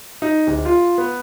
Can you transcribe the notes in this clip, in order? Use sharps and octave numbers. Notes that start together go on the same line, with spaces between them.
D#4
D1
F4
B3